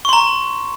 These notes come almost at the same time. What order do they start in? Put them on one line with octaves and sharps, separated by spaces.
C#6 C6 A#5